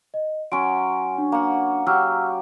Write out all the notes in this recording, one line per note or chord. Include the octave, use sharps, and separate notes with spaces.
D#5
F#3 C#4 A#5 C6 D7
D4
A#3 F#5
F#3 G4 E6 F6